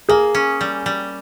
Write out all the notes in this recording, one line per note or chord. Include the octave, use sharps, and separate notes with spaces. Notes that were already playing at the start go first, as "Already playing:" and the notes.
A#3 G#4
C#4
G3
G3